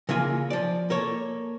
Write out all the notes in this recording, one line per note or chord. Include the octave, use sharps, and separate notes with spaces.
C#3 E3 A#3 F4 G#5
F3 D5
A#3 A4 C#5